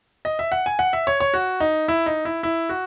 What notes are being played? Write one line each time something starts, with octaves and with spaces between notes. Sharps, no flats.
D#5
E5
F#5
G#5
F#5
E5
C#5
C#5
F#4
D#4
E4
D#4
E4
E4
F#4